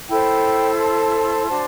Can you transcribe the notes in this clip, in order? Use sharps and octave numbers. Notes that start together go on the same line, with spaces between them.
E4 A4 C5 G5 B5
A5 C6
D4 F#4 C5